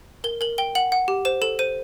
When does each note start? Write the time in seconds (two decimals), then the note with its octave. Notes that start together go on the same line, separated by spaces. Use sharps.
0.24 A#4 G7
0.41 A#4 F#7
0.58 G5 G7
0.75 F#5 F#7
0.92 F#5
1.08 G4
1.25 C5 E7
1.42 A4 E7
1.59 C5 D#7